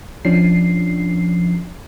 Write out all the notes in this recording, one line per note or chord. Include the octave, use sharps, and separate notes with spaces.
F3 C#4 D4 C7